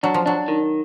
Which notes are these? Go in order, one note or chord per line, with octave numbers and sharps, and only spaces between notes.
F#3 D4
F3
F#3 D4
D#3